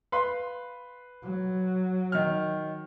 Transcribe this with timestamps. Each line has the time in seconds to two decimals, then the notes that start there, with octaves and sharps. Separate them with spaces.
0.12 B4 F5 C6
1.22 F#3
2.12 D#3 F6